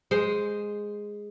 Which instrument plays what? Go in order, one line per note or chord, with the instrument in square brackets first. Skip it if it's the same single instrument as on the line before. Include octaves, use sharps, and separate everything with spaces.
[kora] G#3 C5